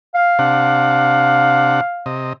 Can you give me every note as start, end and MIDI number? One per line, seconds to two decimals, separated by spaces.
0.15 2.15 77
0.39 1.81 48
0.39 1.81 62
0.39 1.81 78
2.06 2.33 48
2.06 2.33 75